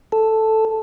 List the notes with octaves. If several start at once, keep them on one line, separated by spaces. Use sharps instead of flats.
A4